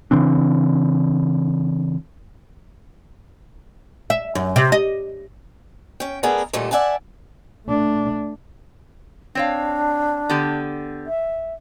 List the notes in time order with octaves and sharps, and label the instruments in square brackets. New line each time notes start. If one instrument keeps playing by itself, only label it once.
[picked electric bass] C#3 E3 C4 D4
[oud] E5
F#2
C3
D#5
[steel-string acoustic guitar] C#4 G5
A3 B3 D4 G#4 A#4
D#2 A#2 D3 G3 A3 D#4
D5 E5 F#5 G#5 A5
[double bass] A3 D4
[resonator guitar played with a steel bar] C4 C#5 F5 [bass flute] D4
[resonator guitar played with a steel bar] D3 B3 G4
[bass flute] E5